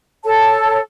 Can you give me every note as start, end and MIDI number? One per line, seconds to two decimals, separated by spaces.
0.24 0.79 69
0.24 0.79 73
0.24 0.79 81